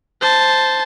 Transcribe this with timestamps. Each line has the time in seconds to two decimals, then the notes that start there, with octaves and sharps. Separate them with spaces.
0.21 C5 A5